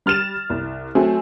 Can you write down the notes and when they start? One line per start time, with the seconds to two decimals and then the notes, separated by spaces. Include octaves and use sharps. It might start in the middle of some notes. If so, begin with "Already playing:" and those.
0.06 G3 F6 A6 E7 F7
0.50 C2
0.95 F#3 A3 C4 G#5